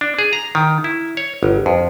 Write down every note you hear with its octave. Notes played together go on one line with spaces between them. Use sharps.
D4
G#4
A#5
D#3
E4
C#5
G1
F2